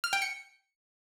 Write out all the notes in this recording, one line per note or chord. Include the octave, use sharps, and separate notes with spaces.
F6
G5
C#7